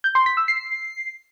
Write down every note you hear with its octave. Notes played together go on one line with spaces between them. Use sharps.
G6
C6
B6
E6
C7